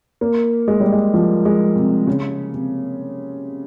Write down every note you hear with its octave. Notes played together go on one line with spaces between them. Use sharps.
A#3
G#3
G3
G#3
F3
G#3
C3
C#3
C3